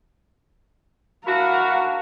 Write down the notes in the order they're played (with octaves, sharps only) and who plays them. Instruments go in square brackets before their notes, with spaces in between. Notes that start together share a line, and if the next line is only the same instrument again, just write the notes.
[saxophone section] D4 E4 F#4 [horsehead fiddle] A#4 F5